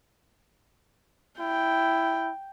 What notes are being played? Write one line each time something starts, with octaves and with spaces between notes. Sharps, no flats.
E4 G5